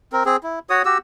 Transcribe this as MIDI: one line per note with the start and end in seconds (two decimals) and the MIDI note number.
0.13 0.23 60
0.13 0.23 70
0.25 0.37 60
0.25 0.37 68
0.43 0.59 64
0.70 0.82 66
0.70 0.82 73
0.70 0.82 87
0.85 0.98 66
0.85 0.98 67
0.85 0.98 88